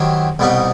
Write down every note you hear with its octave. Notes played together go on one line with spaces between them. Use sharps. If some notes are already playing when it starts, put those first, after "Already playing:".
Already playing: D#3 F#3 C4 E4 G4
C2 B2 G3 D#4